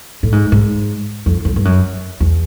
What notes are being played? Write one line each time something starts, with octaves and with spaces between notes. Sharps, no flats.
A2
G#2
G#2
F2
F2
G2
F#2
E2